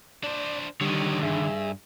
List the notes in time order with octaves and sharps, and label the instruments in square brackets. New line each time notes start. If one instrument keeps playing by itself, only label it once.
[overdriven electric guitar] D4 C5 [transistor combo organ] D5
[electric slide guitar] D3 D#3 [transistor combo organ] G3 [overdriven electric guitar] C#5 D#5
[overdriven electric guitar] G2 [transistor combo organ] G#4 E5